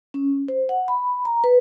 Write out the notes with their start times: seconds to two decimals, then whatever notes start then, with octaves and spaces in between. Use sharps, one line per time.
0.14 C#4
0.48 C5
0.69 F#5
0.88 B5
1.25 A#5
1.44 B4